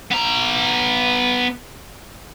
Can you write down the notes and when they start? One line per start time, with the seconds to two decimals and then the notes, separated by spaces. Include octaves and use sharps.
0.11 B3 A#5